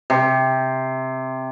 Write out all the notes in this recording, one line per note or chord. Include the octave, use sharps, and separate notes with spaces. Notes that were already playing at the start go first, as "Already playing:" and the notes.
C3